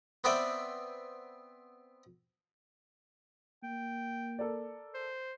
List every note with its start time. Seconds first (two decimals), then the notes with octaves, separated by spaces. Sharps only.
0.24 B3 C4 B4 D5 E5 G5
3.63 A#3 G5
4.39 A4 A#4 D5
4.94 C5